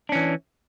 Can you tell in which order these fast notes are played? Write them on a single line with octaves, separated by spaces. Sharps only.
D4 C#4 E3